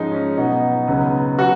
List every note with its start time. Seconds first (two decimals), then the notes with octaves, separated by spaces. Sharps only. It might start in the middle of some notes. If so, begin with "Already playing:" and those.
Already playing: G#2 F3 G#3 C#4 D#4
0.12 C#4
0.37 B2 F#3 B3 D#4
0.87 C#2 C#3 F#3 B3
1.38 F#3 B3 F#4